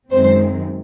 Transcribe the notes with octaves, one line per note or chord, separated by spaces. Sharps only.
F#2 D#3 G#3 C4 C5